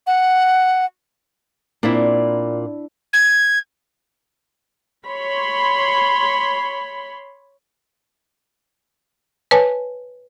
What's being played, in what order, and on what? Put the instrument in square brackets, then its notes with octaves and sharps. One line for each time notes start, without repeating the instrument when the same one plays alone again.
[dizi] F#5
[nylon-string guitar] A#2 C4 [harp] D4 E4
[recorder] G#6
[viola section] C#5 B5 C6
[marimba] B4 C#5 G#5 A5